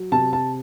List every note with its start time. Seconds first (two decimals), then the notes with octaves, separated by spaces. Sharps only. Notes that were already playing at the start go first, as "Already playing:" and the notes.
Already playing: F#3
0.12 C3 A5
0.33 A5